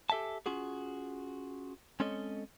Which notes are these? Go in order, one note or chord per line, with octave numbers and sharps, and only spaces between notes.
G4 A4 E5 G#5 A5
C#4 F4 F#4 G#4
G#3 C4 C#4 A4 C#5 D#5